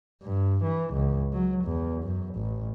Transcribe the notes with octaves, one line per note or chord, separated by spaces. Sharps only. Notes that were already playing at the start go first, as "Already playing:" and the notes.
G2
E3
C#2
F#3
E2
F#2
A1